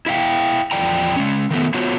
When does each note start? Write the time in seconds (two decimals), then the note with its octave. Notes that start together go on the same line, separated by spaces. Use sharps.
0.06 E4 E5 F5 G5
0.71 E2 F3 D5 G5 A#5
1.16 G#3 C#4
1.51 D#3 A3 B3
1.74 B3 F4 F#4 C5 C#5